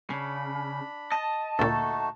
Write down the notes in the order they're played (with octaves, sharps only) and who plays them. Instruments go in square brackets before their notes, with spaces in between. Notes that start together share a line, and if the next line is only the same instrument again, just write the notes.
[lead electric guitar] C#3 [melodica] D4 B5
[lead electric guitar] D#5 [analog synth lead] A5
[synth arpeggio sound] D2 A#2 [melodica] A3 D#4 F#4 [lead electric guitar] A4